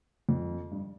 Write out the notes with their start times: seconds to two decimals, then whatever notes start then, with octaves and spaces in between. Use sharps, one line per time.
0.29 F2
0.71 G2